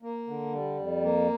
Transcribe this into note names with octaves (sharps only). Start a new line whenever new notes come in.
A#3
D3
G3
F2
A#3